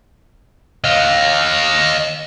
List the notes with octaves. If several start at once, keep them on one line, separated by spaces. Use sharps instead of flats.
D#5 F5